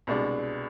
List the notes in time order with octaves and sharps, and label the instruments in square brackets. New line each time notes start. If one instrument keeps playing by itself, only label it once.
[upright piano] C2 B2 G#3 D4